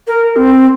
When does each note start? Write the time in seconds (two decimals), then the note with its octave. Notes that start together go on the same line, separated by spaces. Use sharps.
0.07 A#4
0.36 C4